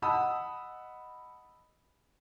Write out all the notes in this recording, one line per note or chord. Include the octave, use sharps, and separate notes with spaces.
D#5 F#5 A5 B5 D#6 E6